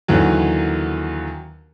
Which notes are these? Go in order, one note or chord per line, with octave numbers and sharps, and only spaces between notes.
D#2 D3 E3 F#3